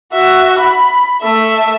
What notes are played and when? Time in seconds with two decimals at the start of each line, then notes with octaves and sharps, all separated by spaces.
0.13 F#4 E5
0.58 B5
1.22 A3 E5